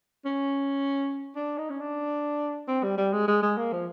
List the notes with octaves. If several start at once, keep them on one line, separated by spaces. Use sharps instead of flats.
C#4
D4
D#4
C#4
D4
C4
G3
G3
G#3
G#3
G#3
A#3
F3